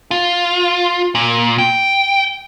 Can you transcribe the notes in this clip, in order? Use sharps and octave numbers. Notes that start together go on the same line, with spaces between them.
F4
A#2
G5